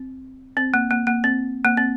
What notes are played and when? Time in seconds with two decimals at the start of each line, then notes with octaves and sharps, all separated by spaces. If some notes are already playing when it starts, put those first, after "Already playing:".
Already playing: C4
0.57 C4
0.74 A#3
0.91 A#3
1.07 A#3
1.24 C4
1.65 A#3
1.77 C4